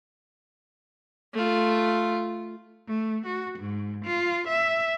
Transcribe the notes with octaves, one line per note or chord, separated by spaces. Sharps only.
A3 F4
A3
F#4
G#2
F4
E5